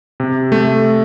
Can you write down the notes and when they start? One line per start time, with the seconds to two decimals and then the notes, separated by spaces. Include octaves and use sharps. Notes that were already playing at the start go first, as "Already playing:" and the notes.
0.20 C3
0.52 A3